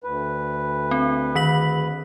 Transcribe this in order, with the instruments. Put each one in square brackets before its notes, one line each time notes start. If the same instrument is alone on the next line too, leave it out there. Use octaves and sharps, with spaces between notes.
[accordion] D2 B4
[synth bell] C4
D#3 B6 F#7